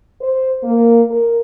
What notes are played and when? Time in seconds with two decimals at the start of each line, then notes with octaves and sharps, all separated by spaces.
0.20 C5
0.64 A#3
1.11 A#4